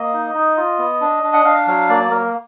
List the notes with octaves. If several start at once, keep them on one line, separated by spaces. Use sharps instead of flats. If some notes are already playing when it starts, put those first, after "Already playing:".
Already playing: A#3 D#5
D#4
D#4
F4
B3
D4
D4
F#5
D4 F5
F#3 F5
A#3 D5
A#3 A#4